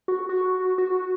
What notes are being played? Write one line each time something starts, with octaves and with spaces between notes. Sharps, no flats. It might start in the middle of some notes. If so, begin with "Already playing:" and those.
F#4
F#4
F#4